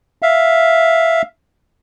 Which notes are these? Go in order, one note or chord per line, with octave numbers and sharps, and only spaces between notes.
E5 F5